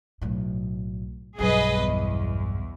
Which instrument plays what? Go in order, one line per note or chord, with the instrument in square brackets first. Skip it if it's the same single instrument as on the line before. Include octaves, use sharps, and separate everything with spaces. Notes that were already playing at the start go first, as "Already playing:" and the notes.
[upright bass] B1 A2
[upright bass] B1 G2 [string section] G#4 B4 D#5
[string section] E2